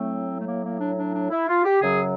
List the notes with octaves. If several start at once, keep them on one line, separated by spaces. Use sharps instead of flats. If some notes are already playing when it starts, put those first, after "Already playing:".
Already playing: A2 F#3 A3 C4
A3
A#3
A#3
D4
D4
D4
E4
F4
G4
F#2 C#3 F#3 G#4